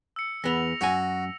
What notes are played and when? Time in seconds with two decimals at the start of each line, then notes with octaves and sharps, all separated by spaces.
0.16 E6 C#7
0.44 E2 B3 A#6 F7
0.81 F#2 F#4 G#5